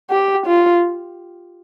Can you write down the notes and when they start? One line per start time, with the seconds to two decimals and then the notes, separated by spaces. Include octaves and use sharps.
0.10 G4
0.46 F4